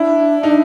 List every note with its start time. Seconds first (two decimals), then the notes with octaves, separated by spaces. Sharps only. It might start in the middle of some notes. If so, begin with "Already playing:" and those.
Already playing: D4 E4
0.43 D#4